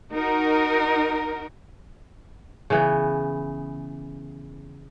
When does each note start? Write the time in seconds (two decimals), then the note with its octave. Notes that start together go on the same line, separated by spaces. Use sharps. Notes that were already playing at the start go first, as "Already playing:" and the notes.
0.11 D#4 F#4 A#4
2.70 C#3 E3 B3